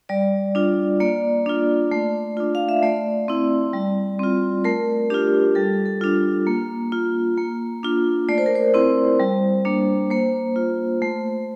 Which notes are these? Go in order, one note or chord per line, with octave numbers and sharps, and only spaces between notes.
G3 D5
D4 F4
A#3 D5
D4 F4
A3
D4 F4
F5
E5
A3 D5
C4 E4
G3
C4 F4
A3 A#4
D4 F4 G4
G3 A4
A4
D4 F4
A#3
F4
A#3
D4 F4
A3 D5
C5
A#4
C5
C4 E4
G3
A#3 D4
A#3 C5
F4
A3